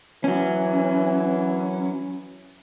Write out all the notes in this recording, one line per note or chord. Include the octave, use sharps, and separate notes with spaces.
E3 F#3 C#4